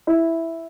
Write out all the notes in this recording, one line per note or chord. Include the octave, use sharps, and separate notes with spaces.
E4